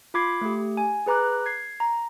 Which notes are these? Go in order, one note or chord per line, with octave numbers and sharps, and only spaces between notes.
F4 B5 D6 G#6 C7
A3 G4
G#5
G#4 B4 A#5 D6 F#6
G#6 C7
A#5